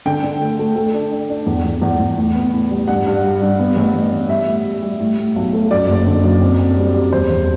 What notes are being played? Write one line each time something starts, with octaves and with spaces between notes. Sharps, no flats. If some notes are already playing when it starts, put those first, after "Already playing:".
D3 G5
D3
A3
A3
A3
D4
D4
D4
E2
E2
E2
E2
A2
B3
A2
G3
G2 F#5
G2
G3
G2
B3
A1
A1
B3
G3 E5
A2
G3
G3
A2
A2
B1
A3
F#2 D5
F#1
D3
F#2
C4
C4
G3
G3
E1 C5
E1